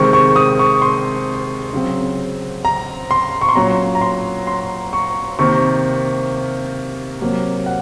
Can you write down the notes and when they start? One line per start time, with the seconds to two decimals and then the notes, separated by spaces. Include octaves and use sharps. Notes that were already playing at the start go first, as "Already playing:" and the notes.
Already playing: C3 D#3 G#3 C4 C#6
0.13 C#6
0.36 D#6
0.59 C#6
0.82 C6
1.73 C#3 F#3 C4
2.65 A#5
3.11 C6
3.41 C#6
3.49 C6
3.55 A#2 F#3 C#4 A#5
3.95 A#5
4.01 C6
4.47 C6
4.93 C#6
5.39 C3 D#3 A#3 C#6
7.21 C3 F#3 A#3
7.66 F#5